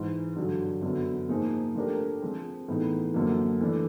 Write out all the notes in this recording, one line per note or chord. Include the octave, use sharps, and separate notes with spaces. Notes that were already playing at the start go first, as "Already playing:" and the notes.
Already playing: G#2 E3 G#3
G2 D3 F#3
F#2 D3 F#3 B3
G#2 F3 A#3 D#4 G#4
F3 A3 D4 G4 A#4
F3 G#3 C4
A2 E3 G#3 B3 D#4
F#2 D3 F3 A#3
E3 A3 D4